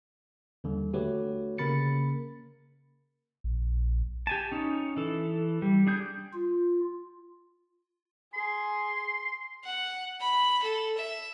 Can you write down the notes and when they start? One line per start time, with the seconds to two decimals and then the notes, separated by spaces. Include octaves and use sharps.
0.64 D#2 D3 G3
0.93 D3 A3 F#4 G4 B4 C#5
1.58 C#3 A#3 A#4 B5 A6 C#7
3.44 A#1
4.27 G4 G#5 A5
4.52 C#4 D#4
4.97 E3 A4
5.62 G3
5.87 D4 G#4 G6
6.33 F4
8.34 G#4 C6
9.64 F#5
10.20 B5
10.63 A4
10.97 E5